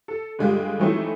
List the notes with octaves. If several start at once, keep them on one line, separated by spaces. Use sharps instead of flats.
A4
G2 D3 G#3 F4 G4
E3 F#3 A3 C4 D#4 E4